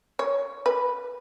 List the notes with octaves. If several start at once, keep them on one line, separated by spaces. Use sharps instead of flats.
C#5
B4